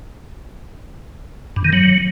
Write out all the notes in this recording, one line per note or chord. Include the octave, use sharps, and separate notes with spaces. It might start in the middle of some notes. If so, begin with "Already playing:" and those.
G2
D#3
F#3